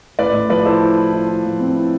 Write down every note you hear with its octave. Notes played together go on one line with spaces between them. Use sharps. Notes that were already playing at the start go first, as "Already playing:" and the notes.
A2 B4 D5
A2
F3 B4 D5
E4 A4 C5
E4
E4
E4
E4
F3
C4
E4